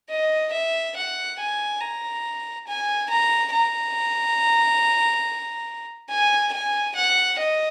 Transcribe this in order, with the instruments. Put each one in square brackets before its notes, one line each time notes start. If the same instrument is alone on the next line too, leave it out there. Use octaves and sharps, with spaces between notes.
[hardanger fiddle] D#5
E5
F#5
G#5
A#5
G#5
A#5
A#5
G#5
G#5
F#5
D#5